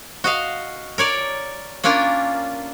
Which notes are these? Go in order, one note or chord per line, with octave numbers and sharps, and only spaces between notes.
F#4 D#5 F5
A#4 C#5 D5
A#3 C#4 D4 F4 A#4